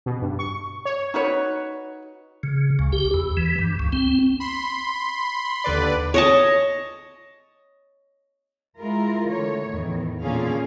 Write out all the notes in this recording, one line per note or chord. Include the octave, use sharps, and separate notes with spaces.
B2
G2
C#6
C#5
D#4 F#4 B4 C#5
C#3
C#2
G4
E2
E3
G2
C#2
C4
B5 C6
D#2 D3 B4 D5
C#5 D#5 A5
G#3 E4 F4 A#4
D3 A3 C#5
E2 A2 D#3
A#2 D3 A#3 C#4 G#4 F5